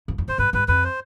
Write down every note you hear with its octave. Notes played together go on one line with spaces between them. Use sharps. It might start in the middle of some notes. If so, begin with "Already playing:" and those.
F2
F2
E2 C5
G2 B4
G2 B4
F2 B4
C5